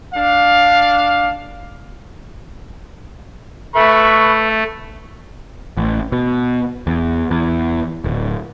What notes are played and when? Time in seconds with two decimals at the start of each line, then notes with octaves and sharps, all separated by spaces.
0.14 D4 F5
3.75 A3 B4 E5 B5 C#6
5.77 A1
6.12 B2
6.87 E2
7.31 E2
8.04 D1